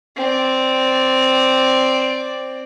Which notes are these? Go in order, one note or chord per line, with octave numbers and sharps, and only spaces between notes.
C4 D5